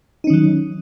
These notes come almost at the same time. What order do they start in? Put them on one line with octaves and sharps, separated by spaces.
D#4 C#4 D#3 F#3